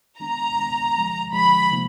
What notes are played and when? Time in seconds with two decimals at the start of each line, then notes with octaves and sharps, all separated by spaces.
0.19 D#3 G#3 B3 D4 A#5
0.58 D#3 G#3 B3 D4
0.95 D3 F3 G#3
1.32 D3 F3 G#3 B5
1.71 C3 F3 A#3 D#4